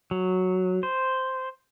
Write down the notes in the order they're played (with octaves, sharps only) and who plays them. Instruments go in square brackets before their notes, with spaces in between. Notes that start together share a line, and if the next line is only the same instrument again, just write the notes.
[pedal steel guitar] F#3
C5